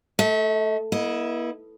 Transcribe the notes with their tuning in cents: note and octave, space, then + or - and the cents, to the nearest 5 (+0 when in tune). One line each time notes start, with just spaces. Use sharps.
A3 +0 E5 -45
B3 -45 E4 +0 D#5 +0